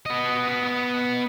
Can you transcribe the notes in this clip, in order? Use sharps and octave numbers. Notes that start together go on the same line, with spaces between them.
B3 D#5